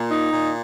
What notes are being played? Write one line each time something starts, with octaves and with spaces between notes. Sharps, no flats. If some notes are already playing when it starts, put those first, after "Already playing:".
Already playing: A#2
D#4
A#2